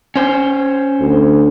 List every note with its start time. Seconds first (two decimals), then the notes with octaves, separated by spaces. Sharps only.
0.16 C#4 C5
1.00 D2